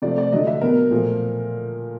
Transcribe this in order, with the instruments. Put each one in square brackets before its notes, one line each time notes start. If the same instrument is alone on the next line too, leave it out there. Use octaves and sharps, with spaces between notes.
[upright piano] C3 F3 A3 D5
D5
D3 F#3 A3 D#5
E5
B2 F#3 B3 A#4
A#2 F3 A3